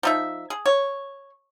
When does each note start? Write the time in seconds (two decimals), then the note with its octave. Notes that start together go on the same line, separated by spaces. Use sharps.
0.03 F3 D#4 E5
0.50 G#4
0.66 C#5